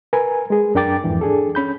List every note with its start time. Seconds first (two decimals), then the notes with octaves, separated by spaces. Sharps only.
0.13 A#4 B4 G#5
0.50 G#3 G#4
0.75 F#2 D4 A#4 G5 D6 A6
1.04 F2 G#2 E3
1.21 D4 G#4 A4
1.55 C#4 B5 G6